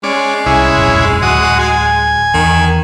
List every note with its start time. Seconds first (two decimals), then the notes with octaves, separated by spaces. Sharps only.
0.03 G#3 C#4 D5
0.46 C2 C#4 E4 G#4
0.76 E1 A#1 F#2
1.22 D1 F#4 D#6
1.59 G#5
2.34 E2 D#3